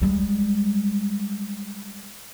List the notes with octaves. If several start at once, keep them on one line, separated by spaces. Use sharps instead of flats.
G3 G#3